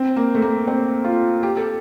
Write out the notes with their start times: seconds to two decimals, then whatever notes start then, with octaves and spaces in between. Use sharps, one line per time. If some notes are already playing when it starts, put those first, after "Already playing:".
Already playing: C4
0.16 A#3
0.35 A3
0.42 A#3
0.67 C4
1.04 F4
1.43 G4
1.57 A4